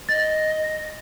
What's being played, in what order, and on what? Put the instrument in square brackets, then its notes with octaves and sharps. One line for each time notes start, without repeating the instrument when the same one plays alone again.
[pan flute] D#5 [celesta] A6